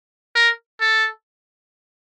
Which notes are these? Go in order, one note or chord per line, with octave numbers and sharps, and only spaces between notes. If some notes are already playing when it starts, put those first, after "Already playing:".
A#4
A4